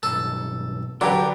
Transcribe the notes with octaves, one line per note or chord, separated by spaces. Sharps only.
B1 G2 A4
D3 F#3 G4 A#4 B4 D5